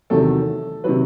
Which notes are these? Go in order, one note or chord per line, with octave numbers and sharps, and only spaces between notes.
E2 C3 D#3 F#3 A3 A4
C3 D#3 F#3 B4